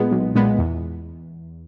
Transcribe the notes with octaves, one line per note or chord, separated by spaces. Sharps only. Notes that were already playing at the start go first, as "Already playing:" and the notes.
Already playing: B1 A#2 G#3 B3
B1
A#2 G#3 B3
E2